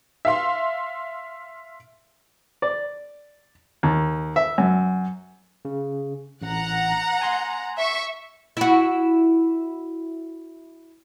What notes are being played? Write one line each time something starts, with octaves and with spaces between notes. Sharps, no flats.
E5 F5 C6
D5
D#2
E5
F#2
C#3
A1 F#5 A#5
G#5 C6
E5 C#6
E4 F#4